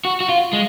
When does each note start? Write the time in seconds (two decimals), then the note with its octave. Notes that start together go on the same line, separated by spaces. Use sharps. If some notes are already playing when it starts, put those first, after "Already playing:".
0.05 F#4
0.21 F#4
0.29 F4
0.53 G#3